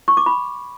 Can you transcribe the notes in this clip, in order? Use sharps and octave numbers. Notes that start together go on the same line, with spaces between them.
C#6
D6
B5